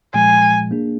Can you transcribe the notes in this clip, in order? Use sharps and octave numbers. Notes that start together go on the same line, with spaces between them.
A#2 F3 G#3 G#5
A#3 D4 G#4